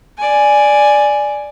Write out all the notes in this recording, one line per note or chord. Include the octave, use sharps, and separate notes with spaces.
D5 G#5